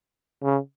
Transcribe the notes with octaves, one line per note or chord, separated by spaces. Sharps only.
C#3